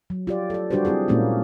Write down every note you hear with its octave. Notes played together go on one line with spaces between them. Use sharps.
F#3
F4 G4 D5
A4 D5
G3 D4 F#4 G4 B4 C5
C4 E4 G4 G#4
A#2 G#3 A#3 C#4 D4 E4